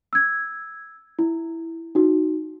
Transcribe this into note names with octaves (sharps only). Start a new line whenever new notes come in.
E6 G#6
E4
D#4 F#4